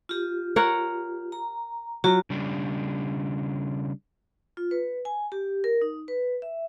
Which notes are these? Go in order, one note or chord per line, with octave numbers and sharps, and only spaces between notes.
F4 G4
A#4 C#5 F#5
A#5
F#3 F4 F#4
C#3 G3 D4
F4
B4
G#5
G4
A#4
D#4
B4
E5